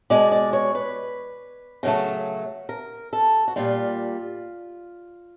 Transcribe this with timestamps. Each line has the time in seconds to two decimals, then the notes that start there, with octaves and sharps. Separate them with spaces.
0.10 B2 G#3 D5
0.32 D5
0.53 C#5
0.75 B4
1.83 C#3 F#3 A3
2.69 A#4
3.13 A4
3.48 F#4
3.56 A#2 G3 F4